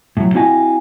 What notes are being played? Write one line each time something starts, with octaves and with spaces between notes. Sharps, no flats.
A2 F#3
C4 E4 F#4 D#5 F5 G#5